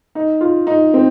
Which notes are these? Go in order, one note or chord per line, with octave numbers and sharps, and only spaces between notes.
D#4
F4
D#4
C4